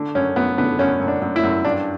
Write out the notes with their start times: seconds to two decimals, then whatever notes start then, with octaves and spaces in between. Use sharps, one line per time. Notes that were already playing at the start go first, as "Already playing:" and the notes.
Already playing: D3
0.15 F#2 C#4
0.36 F#2 B3
0.58 D3 B3
0.79 F#2 C#4
1.00 F#2
1.08 D4
1.22 F#2
1.36 E4
1.43 F#2
1.65 G2 D4